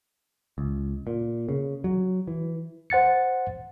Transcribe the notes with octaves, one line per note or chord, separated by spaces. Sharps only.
C#2
A#2
C#3
F#3
E3
C5 F#5 A6 C#7